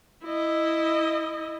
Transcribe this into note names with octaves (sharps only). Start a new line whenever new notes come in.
E4 D#5